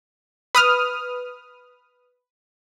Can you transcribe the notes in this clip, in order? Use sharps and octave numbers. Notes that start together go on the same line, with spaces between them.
B4 D#6 F6